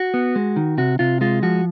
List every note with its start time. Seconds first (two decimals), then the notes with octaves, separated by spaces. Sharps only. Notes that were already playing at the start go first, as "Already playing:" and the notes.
Already playing: F#4
0.14 B3
0.36 G#3
0.56 D#3
0.78 C3 F#4
0.99 C3 F4
1.21 G#3 F4
1.43 F3 F#4